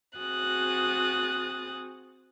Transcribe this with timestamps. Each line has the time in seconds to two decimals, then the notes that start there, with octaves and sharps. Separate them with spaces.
0.18 C4 F#4 G#4 D#6 F#6 A6